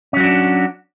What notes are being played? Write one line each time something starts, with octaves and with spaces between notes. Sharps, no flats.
F#3 C#4 D4 F#4